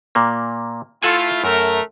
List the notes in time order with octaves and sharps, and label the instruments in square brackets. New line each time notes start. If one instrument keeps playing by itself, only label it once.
[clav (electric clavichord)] A#2 A#3
[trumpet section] A3 E4 F4 [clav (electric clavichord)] A4 F#5 G#5
[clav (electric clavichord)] F#2 [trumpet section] A3 A#4